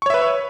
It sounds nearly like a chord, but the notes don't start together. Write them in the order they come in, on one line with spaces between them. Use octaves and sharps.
C#6 C#5 E5 B4